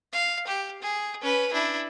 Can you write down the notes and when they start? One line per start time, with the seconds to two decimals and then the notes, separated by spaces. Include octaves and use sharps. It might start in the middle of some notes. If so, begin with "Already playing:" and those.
0.12 F5
0.47 G4
0.81 G#4
1.21 C#4 B4
1.53 D4 E4